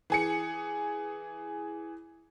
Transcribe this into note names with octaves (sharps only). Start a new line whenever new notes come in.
E3 G#4 C#7